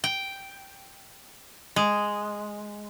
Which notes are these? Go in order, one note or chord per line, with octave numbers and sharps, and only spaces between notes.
G5
G#3